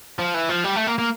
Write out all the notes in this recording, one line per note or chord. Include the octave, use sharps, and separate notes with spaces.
F3
E3
F3
G3
A3
A#3
A#3